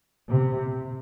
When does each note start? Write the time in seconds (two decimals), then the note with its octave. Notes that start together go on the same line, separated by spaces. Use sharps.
0.29 C3